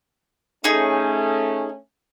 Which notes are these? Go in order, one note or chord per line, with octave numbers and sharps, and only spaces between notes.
A3 C#4 D#4 G#4